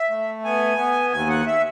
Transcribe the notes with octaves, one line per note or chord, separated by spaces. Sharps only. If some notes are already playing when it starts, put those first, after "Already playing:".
Already playing: E5
A3
B3 G#5
B3
D#2 G#5
F#5
E5